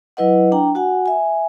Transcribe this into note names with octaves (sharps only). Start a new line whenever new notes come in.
F#3 E4 B4 D#5 F#5
D4 G5 A#5
F#4 F#5 G#5
E5 G#5